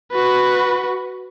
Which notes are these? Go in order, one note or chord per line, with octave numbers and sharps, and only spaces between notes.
F#4 B4